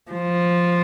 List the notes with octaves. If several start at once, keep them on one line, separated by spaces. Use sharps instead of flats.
F3